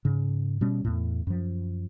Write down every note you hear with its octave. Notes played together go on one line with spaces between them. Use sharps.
G#2 C#3
B2 G3 C#4
E2 A2
F#2 F3